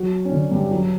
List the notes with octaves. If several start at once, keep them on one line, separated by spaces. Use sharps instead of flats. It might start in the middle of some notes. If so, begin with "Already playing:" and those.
Already playing: F#3 F#4
C#4
D3 D4
G2 G3
F#3